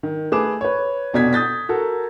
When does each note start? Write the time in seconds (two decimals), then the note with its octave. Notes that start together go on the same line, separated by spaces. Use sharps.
0.03 D#3
0.32 A3 G#4 B4 D6 E7
0.61 B4 C#5
1.13 F1 B2 D5 G#6 B6
1.33 D#6 G6 A6 B6
1.69 F#4 A4 A#4